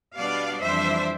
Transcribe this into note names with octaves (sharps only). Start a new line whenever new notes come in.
B2 G3 B3 D4 D5 F5
F2 E3 G3 D4 C5 E5